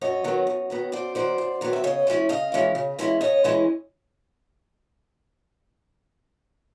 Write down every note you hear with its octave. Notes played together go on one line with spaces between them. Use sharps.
F#2 C#5 D#5
D#3 F#3 B3
F#2
D#3 F#3 B3
F#2 C5 D5
D#3 F#3 B3 C5 D5
F#2
D#3 F#3 B3
E5
C#3 C#5 D#5
E3 G#3 C#4 E4
C#3 D#5 F5
E3 G#3 C#4 E4
C#3
E3 G#3 C#4 E4
C#3 C#5 D#5
E3 G#3 C#4 E4